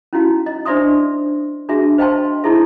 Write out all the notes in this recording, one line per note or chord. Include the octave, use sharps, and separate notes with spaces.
C#4 D#4 E4 F#4 F5
D#5
D4 C5 D5 E5 C6 D#6
D4 F#4 G#4 E5
C5 D#5 F5 G5 A5 C6
D#4 E4 G#4 A4 E5